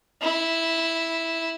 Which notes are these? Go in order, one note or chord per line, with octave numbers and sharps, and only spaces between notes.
E4